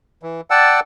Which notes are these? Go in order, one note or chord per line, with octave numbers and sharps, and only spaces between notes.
E3
D5 F#5 G5 A5 E6